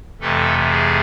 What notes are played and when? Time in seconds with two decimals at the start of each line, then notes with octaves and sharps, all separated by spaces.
0.20 F2 C3 E3 A3 A4
0.70 G#4